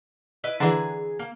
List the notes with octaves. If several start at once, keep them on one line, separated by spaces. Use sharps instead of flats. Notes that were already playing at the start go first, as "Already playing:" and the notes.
E4 B4 D#5
D3 E3 G#4 A#5
A#3